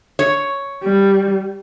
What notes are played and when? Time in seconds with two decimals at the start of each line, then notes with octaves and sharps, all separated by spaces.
0.19 C#5
0.83 G3